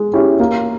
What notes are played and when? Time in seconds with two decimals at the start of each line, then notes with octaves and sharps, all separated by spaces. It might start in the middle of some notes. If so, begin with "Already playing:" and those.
Already playing: G#3
0.13 C#4 E4 G4
0.40 A#3